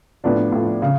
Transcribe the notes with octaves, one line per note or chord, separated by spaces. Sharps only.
A2 F3 B3 D4
A2 F3
C#3